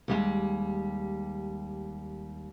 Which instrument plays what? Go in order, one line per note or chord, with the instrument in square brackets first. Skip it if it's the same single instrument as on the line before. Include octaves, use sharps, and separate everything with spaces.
[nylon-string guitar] D#2 G3 G#3